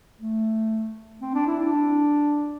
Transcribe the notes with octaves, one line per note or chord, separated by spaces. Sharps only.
A3
C4
D4
E4
D4